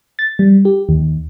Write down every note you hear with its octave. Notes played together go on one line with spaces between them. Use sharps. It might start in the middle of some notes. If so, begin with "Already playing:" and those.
A6
G3
G4
D#2